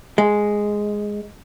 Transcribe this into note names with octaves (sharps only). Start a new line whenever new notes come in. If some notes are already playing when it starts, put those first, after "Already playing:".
G#3